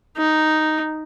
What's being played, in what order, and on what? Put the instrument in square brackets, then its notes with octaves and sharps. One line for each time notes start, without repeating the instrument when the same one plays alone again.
[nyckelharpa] D#4